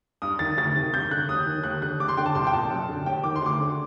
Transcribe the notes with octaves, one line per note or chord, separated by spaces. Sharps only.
G2 D#6
D#3 A6
D2 A6
C3 D#3
G2 G6
D3 F#6
D#2 D#6
D#3
D#2 F#6
D3 F#6
D#2 D6
C6
D3 G5
A5
C2 C6
G5
A#2 A5
F#2
D3
D#2 G5
D#3 D6
C6
D2 D6
D3